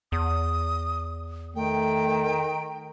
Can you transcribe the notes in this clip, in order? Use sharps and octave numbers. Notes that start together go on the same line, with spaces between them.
E2 D#6
D#3 A3 G5